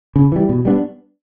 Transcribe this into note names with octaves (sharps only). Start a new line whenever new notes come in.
C#3
E3 G3
B2
G3 B3 D4